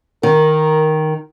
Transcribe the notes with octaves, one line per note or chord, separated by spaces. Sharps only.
D#3 A#4